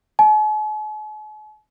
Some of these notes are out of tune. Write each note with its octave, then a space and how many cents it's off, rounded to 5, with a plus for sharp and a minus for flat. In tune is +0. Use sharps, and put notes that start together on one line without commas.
G#5 +45